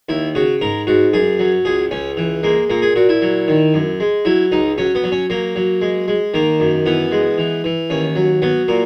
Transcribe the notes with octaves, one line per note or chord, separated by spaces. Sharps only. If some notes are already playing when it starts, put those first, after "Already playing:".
D#2 E4
C#3 F#4
G#2 A#4
G#2 F#4
F#2 G#4
F#3
C#2 G#4
C#2 C#4
E3
G#3 A#3
A#2 A#3
G#4
A#2 F#4
E4
F#3
D#3
F#2
G#3
F#3 E4
C#2 D#4
F#3 C#4
B3
F#3
C#4
F#3 A#3
F#3
G#3
G#3
D#3 A#3
F#2
E3 B3
G#3
E3
E3
D#2 C#4
F#3
F#3 B3
A#2 A#3